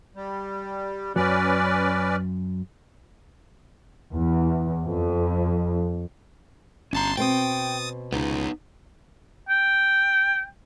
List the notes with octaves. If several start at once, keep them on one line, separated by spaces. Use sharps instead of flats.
G3
F#2 F#3 C#4 B4 D5
E2
F2
G1 C#4 A5 A#5 C6
B2 C4 G5 D#6 A6
C#2 B3 D#4
G5